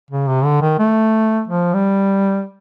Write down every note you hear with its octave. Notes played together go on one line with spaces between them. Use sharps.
C#3
C3
D3
D#3
A3
F3
G3